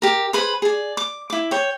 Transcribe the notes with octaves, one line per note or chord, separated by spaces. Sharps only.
G4 A#4
G#4 B4 C5 B5
G#4 D5
D6
E4 D6
C#5 G5